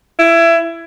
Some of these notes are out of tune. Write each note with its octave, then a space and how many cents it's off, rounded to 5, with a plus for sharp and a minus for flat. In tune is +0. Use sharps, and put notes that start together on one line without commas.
E4 +20